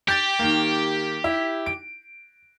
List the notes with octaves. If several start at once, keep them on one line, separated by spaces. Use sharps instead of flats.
G4 G6 A6
D#3 A#3
E4
D7